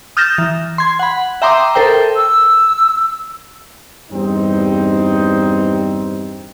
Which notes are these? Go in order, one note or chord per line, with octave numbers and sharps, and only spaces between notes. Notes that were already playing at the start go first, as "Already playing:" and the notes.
D#6 F6 G6 A6 A#6 E7
E3
C6 G#6
F#5 B5
E5 G5 A#5 C6 D6 D#6
A4 A#4 C5 G5
E6
E2 G2 G3 C4 D#4